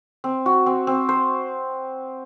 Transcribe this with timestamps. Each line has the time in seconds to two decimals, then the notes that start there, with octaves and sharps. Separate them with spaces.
0.24 C4
0.46 F#4
0.66 C4
0.87 C4
1.09 C5